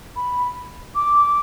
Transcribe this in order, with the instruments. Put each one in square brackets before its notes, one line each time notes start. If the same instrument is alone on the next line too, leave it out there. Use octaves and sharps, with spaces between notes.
[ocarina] B5
D6